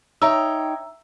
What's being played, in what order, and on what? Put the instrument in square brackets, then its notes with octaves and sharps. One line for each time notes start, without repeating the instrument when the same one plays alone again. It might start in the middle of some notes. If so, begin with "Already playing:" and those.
[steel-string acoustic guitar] D#4 C#5 G5 [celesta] E5 A#5 E6